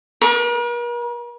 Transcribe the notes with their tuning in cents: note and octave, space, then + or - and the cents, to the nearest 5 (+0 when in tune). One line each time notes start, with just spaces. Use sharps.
A#4 +45